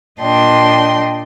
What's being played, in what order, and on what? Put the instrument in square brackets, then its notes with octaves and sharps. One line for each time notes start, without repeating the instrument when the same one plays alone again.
[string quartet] A#2 D4 D#5 G5 C6